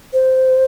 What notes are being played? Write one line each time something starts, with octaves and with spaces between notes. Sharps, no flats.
C5